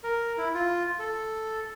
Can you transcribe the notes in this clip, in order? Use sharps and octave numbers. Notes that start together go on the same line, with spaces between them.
A#4
E4
F4
A4